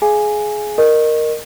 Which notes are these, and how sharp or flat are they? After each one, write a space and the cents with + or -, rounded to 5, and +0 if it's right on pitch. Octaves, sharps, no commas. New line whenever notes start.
G#4 +20 F5 -30 G#5 +0
A#4 +0 D#5 -25 C#6 -30